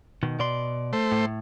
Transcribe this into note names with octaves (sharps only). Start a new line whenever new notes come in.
B2 D#3
B2 D5 C6
A3 C5
A2